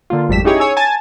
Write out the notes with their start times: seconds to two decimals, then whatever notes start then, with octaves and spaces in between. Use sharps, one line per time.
0.10 D3 A#3 F4
0.29 G#1 F2 G3 A3 B6 E7
0.45 C#4 D#4 E4 G4 G#4 C#5
0.60 G#4 C#5 G#5 E6
0.77 G#5 A5 A6